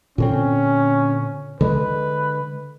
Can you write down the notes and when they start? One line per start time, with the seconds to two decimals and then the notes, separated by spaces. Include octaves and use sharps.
0.18 A#2 D3 C4 C#4
1.61 D3 G#3 B4